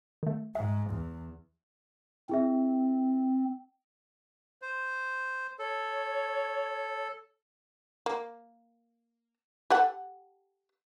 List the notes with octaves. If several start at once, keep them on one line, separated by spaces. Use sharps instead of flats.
D#3 A3
G#2 E5
E2
C4 E4 G#4 E5
C5
A4 C#5
A#3
G4 A4 F#5